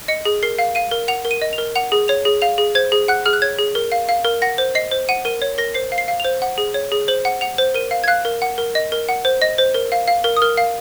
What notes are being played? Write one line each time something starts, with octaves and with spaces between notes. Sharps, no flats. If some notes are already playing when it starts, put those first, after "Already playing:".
D#5 C#7
G#4
A#4 C7
F5
F5 D#7
A#4
F#5 F7
A#4
D#7
D#5
F7
A#4
F#5 F7
G#4
C#5 F7
G#4
F5 F7
G#4
C5 G#6
G#4
F#5 F#6
G#4 F6
F#6
C#5 G#6
G#4
A#4
F5
F5
A#4
F#5 A#6
C5
D#5 C7
C5
F#5 D#7
A#4 D#7
C#5
A#4 A#6
C5 C7
F5
C7
F5
C5 F7
F#5
G#4
C#5
G#4
C5 F#7
F#5
F#5 F7
C5
A#4 D#7
F5
G#6
F5 F#6
A#4
F#5
A#4
D#5
A#4
F#5
C5
D#5 A#6
C5
A#4
F5
F5
A#4
D#6
A#4 F6
F5